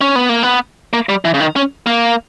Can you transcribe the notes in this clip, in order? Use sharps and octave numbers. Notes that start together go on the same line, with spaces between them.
C#4
B3
A#3
B3
A#3
G3
E3
C#3
D#3
C#4
A#3